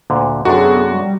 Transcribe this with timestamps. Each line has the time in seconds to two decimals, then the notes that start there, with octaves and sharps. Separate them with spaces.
0.10 D2 A#2 D3
0.45 F#2 C3 B3 D4 F#4 G#4 A4
0.93 G3